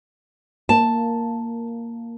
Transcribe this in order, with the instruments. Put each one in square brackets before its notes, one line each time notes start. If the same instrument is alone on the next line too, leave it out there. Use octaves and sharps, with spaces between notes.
[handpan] A#3 [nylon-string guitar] A5